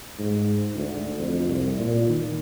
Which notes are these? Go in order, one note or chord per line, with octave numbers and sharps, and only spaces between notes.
G#2
D2
F2
C2
A#2
D#3